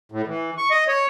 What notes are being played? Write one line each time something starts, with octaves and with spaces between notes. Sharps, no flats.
A2
E3
C#6
D#5
C#5